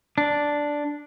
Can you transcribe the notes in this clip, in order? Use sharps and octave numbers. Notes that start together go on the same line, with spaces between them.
D4